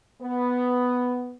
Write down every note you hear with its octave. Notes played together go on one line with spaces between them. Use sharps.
B3